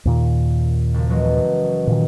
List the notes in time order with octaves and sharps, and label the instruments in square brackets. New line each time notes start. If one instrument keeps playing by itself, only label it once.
[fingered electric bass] D#2 A#2 D#3
[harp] F#1
E3 F#3 G#3
[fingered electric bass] A#2 D#3